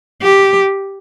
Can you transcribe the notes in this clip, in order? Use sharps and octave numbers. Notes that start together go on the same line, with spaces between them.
G4